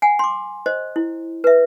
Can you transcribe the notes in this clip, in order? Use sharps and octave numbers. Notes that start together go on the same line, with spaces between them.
F#5 G#5
C6 D6
C5 D#5
E4
B4 E5